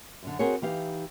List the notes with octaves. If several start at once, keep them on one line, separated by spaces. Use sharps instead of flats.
F#2 D3
C4 F#4 G#4 A#4 C#5
E3 D#4 G4 F5